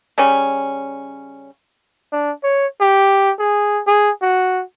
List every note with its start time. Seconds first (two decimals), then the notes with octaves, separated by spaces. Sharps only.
0.18 C#3 G3 C#4
2.12 D4
2.43 C#5
2.80 G4
3.39 G#4
3.87 G#4
4.22 F#4